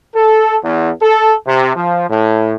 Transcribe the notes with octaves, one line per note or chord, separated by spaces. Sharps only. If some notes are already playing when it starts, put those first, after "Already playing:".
A4
E2
A4
C3
F3
A2